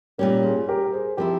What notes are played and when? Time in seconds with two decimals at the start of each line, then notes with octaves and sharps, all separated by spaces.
0.18 A#2 G3 C#4 G4 A#4
0.43 F4 G#4
0.68 G4 A#4
0.84 A#4
0.93 G#4 C5
1.17 F3 C4 E4 G4 A#4